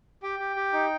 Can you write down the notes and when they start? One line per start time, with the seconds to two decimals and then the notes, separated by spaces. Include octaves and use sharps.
0.23 G4 G5
0.40 G4
0.56 G4
0.73 D#4